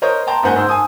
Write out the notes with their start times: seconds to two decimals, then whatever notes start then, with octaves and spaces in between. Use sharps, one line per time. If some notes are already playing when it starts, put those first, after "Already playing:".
0.02 A#4 C5 C#5 D#5
0.27 G5 A5 A#5 C6
0.43 F#1 G#2 C5 F#5 G#5 G6
0.55 G#2 C5 C6 E6
0.69 G#5 A5 D#6